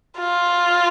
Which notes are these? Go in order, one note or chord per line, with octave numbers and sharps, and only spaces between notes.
F4